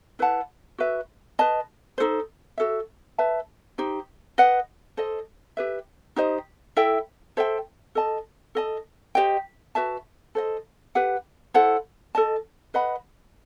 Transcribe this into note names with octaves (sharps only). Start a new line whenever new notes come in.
E4 B4 F#5 A5
F#4 B4 E5
B4 D#5 A5
D#4 F#4 A4 C5
F#4 A4 E5
B4 E5 A5
D#4 G4 C5
B4 D#5 F#5
A4 C5 D#5
G4 B4 E5
D#4 G4 C5 D#5
E4 A4 E5 G5
A4 C5 E5 G5
A4 D#5 A5
A4 D#5 A5
G4 C5 D#5 G5
F#4 B4 E5 A5
A4 C5 D#5
G4 B4 F#5
E4 A4 C5 F#5
A4 D#5 A5
B4 D#5 F#5 B5